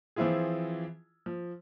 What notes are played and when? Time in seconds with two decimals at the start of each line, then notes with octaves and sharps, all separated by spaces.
0.16 E3 F3 C4 E4 F4 G#4
1.26 F3